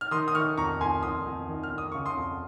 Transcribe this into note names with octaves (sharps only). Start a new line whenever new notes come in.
F6
D#3 C6 D#6
D#6
D#3 C#6 F6
F2 A#5 C#6
F2 G#5 C6
F2 C6 D#6
F2
D#3
F6
F2
D#6
C#3 C#6
C6 D#6
F2